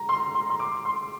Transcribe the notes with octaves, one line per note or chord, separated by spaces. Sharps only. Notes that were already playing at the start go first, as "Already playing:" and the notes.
Already playing: A#5
C6
C6
C6
D6
C6